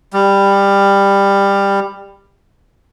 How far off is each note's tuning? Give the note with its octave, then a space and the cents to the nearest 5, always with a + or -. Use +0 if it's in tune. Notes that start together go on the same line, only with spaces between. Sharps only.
G3 +15